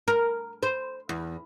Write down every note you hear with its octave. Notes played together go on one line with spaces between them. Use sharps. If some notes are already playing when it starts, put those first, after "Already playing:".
A#4
C5
E2